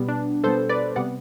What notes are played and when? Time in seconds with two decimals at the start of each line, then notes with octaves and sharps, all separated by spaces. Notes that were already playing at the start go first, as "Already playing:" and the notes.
Already playing: B2 G3 B3
0.08 D4
0.44 B2 G3 B3 A4 C5
0.69 B4 D5
0.96 C3 G3 B3 D5 F#5